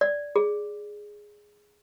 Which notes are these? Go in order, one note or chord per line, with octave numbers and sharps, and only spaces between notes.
D5
G#4